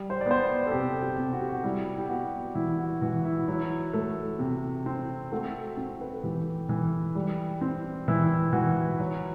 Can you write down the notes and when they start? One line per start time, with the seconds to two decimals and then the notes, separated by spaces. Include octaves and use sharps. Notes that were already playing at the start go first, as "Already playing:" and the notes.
Already playing: G3
0.10 C5
0.21 D5
0.26 B3 C5
0.66 A4
0.71 C3 G4
1.02 G4
1.18 C3
1.33 F#4
1.41 G4
1.49 F#4
1.64 G3 E4
1.98 G4
2.09 B3 F#4
2.55 E3 E4
2.78 F#4
3.01 E3 F#4
3.25 E4
3.48 F#3 E4
3.93 A3
4.39 C3
4.86 C4
5.32 A3 F#4
5.77 C4
6.01 B4
6.12 A4
6.23 E3 G4
6.69 E3
7.15 G3
7.61 C4
8.08 E3 E4
8.53 E3 F#4
9.00 F#3